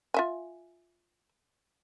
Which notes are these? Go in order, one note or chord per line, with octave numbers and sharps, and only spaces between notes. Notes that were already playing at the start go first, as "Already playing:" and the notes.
F4 E5 G#5